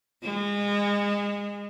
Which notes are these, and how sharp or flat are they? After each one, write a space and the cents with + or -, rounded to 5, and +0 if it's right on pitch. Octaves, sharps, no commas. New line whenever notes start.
G#3 -30